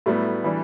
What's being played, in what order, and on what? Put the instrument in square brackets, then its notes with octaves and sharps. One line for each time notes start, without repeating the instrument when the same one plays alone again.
[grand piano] A2 G3 B3 [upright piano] F#3 A3
[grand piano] E3 G3 D4